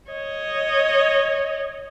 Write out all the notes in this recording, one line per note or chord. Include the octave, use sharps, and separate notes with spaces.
C#5 D#5